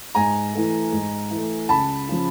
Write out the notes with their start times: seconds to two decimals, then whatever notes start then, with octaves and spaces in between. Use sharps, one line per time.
0.15 G#2 G#5 A#5
0.53 E3 A3
0.92 G#2
1.31 E3 A3
1.69 C#2 A5 B5
2.09 C#3 F3